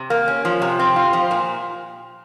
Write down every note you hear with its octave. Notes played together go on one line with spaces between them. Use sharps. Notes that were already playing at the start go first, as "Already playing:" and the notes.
Already playing: C3
A#3
C#4
F3
C3
C4
F4
F3
A#2